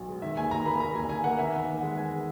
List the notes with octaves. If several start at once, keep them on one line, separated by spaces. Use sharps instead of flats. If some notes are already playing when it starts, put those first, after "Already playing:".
Already playing: B1
G#3
D#3 E5
D#2 G#5
D#2 A#5
A#3 B5
D#3 A#5
D#2 G#5
D#2 G#5
A#3 F#5
D#3 E5
E2
E2
G#3 F#5
D#3 G#5